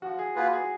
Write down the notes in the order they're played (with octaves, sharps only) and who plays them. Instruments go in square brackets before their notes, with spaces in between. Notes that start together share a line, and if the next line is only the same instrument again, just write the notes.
[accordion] F3 [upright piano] F#4
[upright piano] G#4
[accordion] A#3 F4 G#4 B4 [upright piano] F#4
[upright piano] G#4